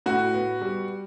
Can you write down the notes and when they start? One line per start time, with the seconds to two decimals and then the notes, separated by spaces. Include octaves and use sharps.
0.06 A2 F#4
0.34 B3
0.62 G3